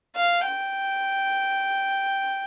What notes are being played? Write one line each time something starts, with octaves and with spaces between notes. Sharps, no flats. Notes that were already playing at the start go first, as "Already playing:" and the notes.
F5
G5